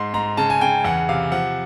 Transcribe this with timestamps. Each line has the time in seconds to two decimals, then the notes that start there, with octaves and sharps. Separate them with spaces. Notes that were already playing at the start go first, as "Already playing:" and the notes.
Already playing: G#2 C6
0.14 G#2 A#5
0.37 C#3 A5
0.50 G#5
0.61 C#3 G5
0.85 E2 F#5
1.09 C3 F5
1.32 F3 F#5